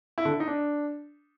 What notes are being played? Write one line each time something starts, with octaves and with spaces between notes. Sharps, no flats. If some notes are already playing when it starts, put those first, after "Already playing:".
E4
D3
E4
D#4
D4